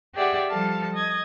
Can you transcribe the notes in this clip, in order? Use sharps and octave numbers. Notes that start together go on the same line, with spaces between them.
G4 G#4 D5 E5 F#5
F3 G3 A4 F5 A5
D#5 G#6